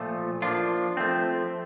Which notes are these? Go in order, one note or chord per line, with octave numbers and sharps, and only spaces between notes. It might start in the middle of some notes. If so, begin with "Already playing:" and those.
Already playing: A#2 F3 A3
F3 A#3 D4 F4
F3 A3 C4